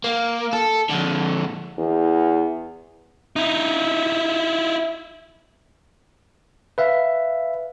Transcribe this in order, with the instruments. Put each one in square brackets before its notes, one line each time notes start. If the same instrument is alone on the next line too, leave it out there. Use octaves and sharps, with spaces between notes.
[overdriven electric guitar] A#3
A4
F2 D3
[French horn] E2
[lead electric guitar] D#4 E4
[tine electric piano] B4 E5 F5